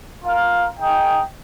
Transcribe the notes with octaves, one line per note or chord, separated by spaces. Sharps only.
F4 A#4 F5
D#4 G#4 D#5 G5